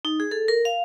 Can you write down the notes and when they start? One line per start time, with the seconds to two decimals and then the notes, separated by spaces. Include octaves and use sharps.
0.05 D#4
0.20 G#4
0.31 A4
0.48 A#4
0.65 F5